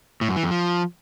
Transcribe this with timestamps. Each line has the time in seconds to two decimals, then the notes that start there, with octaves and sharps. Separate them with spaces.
0.21 A2
0.29 F#2
0.36 E3
0.44 F2
0.51 F3